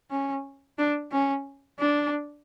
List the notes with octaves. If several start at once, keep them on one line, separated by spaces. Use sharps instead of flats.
C#4
D4
C#4
D4